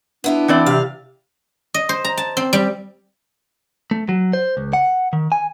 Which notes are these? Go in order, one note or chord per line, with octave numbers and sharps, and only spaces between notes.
B3 D4 E4 F4
E3 C4 D5
C3 F5
D#5
C5
A#5
A5
C4
G3
A3
F#3
C5
C#2
F#5
D#3
G#5